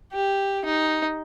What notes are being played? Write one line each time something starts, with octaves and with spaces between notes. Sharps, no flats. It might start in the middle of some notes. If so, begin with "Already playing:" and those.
G4
D#4